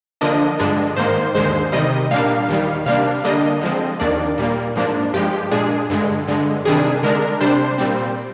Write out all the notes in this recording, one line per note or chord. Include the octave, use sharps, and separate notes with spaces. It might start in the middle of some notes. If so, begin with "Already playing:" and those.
D3 F3 A#3 D4 D#5
G2 D3 G#3 D4
G#2 D#3 A#3 C5
D#2 D3 G#3 C5
C3 D#3 G3 D#5
A#2 G3 A#3 D4 F5
D#2 D#3 G3
C3 G3 A#3 D4 F5
D3 G3 A#3 D4 D#5
D3 F3 G#3 C4
D#2 D#3 A#3 D4 D5
A#2 G3 A#3
G#2 F3 A#3 D4
G2 F3 G#3 G4
A#2 G#3 D4 G#4
G2 D3 G#3
G2 D3 G#3
C3 D#3 G3 D4 G#4
D3 G#3 D4 A#4
C3 G3 D4 C5
A#2 G3 C4